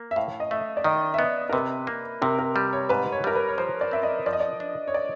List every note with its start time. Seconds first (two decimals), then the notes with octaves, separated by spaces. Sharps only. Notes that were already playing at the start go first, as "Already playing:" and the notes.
Already playing: A#3
0.11 E5
0.16 A2 F5
0.40 D#5
0.51 A3 E5
0.77 D5
0.84 D#3 D#5
1.14 E5
1.19 B3 D#5
1.49 A#4
1.53 C3 B4
1.87 A#3
2.22 C3 A#4
2.39 A#4
2.56 G3
2.73 C#5
2.89 G#2 B4
3.12 C#5
3.24 G3 A#4
3.36 B4
3.48 C#5
3.58 F3 C5
3.81 D5
3.91 C4 E5
4.03 D#5
4.26 F3 D5
4.33 D#5
4.40 D5
4.60 D4
4.88 C#5
4.94 D5